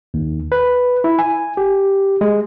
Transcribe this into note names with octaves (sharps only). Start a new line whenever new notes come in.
D#2
B4
E4
G#5
G4
G#3